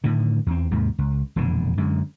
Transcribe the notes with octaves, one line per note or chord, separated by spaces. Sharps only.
A2 D3 D#3
E2 C4
D#2 G#2 C3
C#2
E1 F2 A#2 D3
F#2 D3 G#3